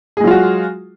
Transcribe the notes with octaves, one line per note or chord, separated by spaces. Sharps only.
F#3 G#3 F4 F#4 G#4